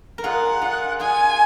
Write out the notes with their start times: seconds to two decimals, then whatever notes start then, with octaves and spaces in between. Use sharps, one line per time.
0.18 A#4
0.24 F4 G#4 F#5
0.61 F4 G#4
1.00 F4 G#4 G#5